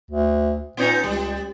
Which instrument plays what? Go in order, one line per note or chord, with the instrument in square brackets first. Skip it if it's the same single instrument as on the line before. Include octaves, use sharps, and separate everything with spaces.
[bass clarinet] D2
[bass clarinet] A#2 [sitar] B3 C#4 D#4
[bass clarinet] C#2 [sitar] G3